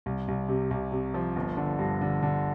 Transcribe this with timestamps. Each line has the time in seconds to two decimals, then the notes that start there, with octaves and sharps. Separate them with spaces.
0.06 C2
0.28 C2
0.49 C3
0.71 C2
0.92 C3
1.14 F3
1.36 G1
1.57 D3
1.79 G2
2.01 D3
2.22 D3